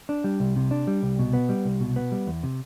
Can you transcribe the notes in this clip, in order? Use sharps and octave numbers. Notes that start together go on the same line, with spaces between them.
D4
G3
C2
C3
D4
G3
C2
B2
B3
G3
C2
B2
B3
G3
E2
C3